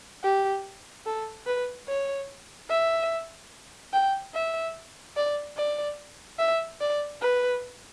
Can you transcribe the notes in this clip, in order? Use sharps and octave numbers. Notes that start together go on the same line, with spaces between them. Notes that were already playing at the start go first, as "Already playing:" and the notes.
G4
A4
B4
C#5
E5
G5
E5
D5
D5
E5
D5
B4